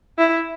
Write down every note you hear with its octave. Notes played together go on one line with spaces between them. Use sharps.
E4